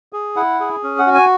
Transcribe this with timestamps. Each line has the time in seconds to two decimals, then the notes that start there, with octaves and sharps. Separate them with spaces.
0.13 G#4
0.36 E4 F#5
0.60 G#4
0.83 C#4
0.99 F#5
1.07 F#4
1.14 G#5